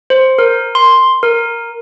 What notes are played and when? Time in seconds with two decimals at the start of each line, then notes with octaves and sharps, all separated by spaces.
0.10 C5
0.39 A#4
0.75 C6
1.23 A#4